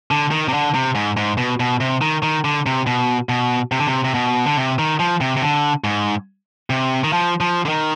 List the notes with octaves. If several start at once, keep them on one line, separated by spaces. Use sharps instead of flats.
D3
D#3
C3
D3
C3
G#2
G#2
B2
B2
C3
D#3
D#3
D3
C3
B2
B2
C3
D3
C3
C3
B2
D3
C3
D#3
F3
C3
C3
D3
G#2
C3
D#3
F3
F3
D3
D#3